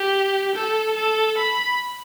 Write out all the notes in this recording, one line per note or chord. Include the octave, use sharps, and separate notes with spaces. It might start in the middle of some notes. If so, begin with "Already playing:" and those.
Already playing: G4
A4
A4
B5